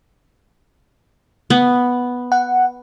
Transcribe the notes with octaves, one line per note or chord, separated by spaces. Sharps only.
B3
F#5